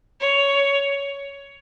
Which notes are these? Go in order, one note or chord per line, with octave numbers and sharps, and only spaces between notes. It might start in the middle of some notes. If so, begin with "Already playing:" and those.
C#5